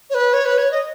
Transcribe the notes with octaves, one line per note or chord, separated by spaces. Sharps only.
C#5
B4
C#5
B4
C#5
D#5